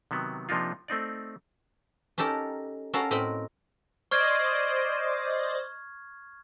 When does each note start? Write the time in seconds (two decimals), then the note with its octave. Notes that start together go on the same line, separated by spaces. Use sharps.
0.11 C3 D#3 F#3 B3
0.49 C3 F3 A#3 D4 D#4 F4
0.88 A3 C4 D#4 D5
2.18 C#4 D#4 G4 A4 A#4
2.94 C#4 F#4 A4 A#4 F5 F#5
3.11 A2 C4 A#4 D#5 B5
4.11 C5 D5 D#5 C#6 F6 G#6